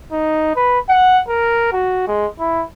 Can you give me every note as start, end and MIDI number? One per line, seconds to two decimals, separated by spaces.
0.12 0.52 63
0.56 0.79 71
0.89 1.21 78
1.29 1.70 70
1.73 2.07 66
2.07 2.27 56
2.39 2.64 64